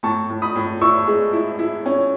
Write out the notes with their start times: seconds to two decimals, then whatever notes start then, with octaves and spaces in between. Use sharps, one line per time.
0.03 A2 A5 C#6
0.30 A2
0.42 B5 D#6
0.55 A2
0.81 E4 C#6 E6
1.07 G#3
1.33 E4
1.59 E4
1.86 C#4